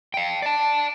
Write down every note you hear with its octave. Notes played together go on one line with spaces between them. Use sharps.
F5 G5
D5 A5